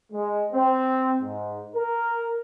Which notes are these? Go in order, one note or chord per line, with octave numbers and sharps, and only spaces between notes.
G#3
C4
G#2
A#4